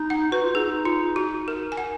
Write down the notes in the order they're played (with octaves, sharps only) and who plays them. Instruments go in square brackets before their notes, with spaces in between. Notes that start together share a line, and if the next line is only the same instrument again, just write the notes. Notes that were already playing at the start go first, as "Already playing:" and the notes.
Already playing: [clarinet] D#4
[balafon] F#5
[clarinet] F#4 [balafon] B4
[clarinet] F4
[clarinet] D#4 [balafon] G#4
[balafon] F4
F#4
A#4
G#5
F#5